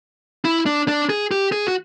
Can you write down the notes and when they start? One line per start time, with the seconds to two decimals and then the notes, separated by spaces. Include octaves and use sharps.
0.45 E4
0.66 D4
0.88 D4
1.10 G#4
1.31 G4
1.52 G#4
1.68 F#4